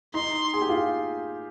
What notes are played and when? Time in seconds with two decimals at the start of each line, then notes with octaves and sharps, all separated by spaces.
0.14 D#4 C6
0.53 G#4
0.62 G4
0.69 F4